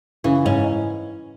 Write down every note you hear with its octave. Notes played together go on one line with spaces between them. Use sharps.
C#3 E3
G#2 C#4